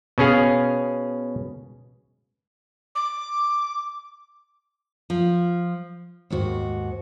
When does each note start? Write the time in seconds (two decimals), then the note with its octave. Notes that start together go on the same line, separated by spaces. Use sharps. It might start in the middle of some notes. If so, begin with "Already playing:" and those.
0.18 B2 C#4 G#4 F5
2.95 D6
5.10 F3
6.30 D#2 G#2 F#4